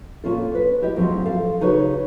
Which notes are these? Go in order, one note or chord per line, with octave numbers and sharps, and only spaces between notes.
A#2 A#3 C#4 F4 A4
B4
E4 G4 D#5
D2 G#2 F3 F#3 C4
A4 F5
C#3 D#4 F#4 B4 C#5